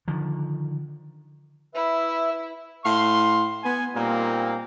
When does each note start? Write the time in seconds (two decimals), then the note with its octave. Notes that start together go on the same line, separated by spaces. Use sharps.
0.08 D3 D#3 F3
1.75 E4 B4 E5
2.85 A2 F5 C6
3.63 B3 G#5
3.95 A#2 G3 A#3 C4 D#4